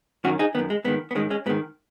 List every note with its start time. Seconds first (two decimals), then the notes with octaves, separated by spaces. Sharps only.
0.24 F#2 D#3 C#4 F#4
0.39 D#4 G#4
0.55 D#3 B3
0.59 F#2
0.70 G#3
0.84 G#2 D#3 B3
1.11 B3
1.15 G#2 D#3 G#3 C#4
1.30 G#3 C#4
1.46 G#2 B3
1.50 D#3